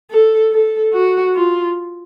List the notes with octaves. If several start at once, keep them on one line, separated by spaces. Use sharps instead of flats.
A4
A4
F#4
F4